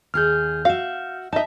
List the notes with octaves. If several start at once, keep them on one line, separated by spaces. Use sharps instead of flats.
D#2 G#4 F6 G6
F#4 E5 F5
D#4 D#5 E5 A5